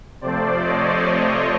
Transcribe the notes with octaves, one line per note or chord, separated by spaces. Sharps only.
C3 F3 A3 C5 D5
C#5 D#5